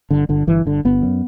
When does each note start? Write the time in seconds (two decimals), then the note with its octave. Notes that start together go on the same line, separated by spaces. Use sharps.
0.11 G1 D3
0.29 G1 D3
0.47 G1 E3
0.66 G1 D3
0.85 G1 B3
1.03 F#2